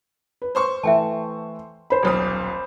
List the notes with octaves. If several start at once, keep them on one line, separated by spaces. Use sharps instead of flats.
B4
C5 C6 C#6
E3 A3 E5 G5 A5
C5 B5
D#1 B1 D#6